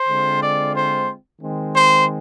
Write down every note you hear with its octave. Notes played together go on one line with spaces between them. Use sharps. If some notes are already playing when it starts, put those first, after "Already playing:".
Already playing: C5
D3 G#3 C4 F4
D5
C5
D#3 G#3 C4
C5